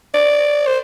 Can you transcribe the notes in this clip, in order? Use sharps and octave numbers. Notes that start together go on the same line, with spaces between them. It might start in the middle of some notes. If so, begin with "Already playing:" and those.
D5
C5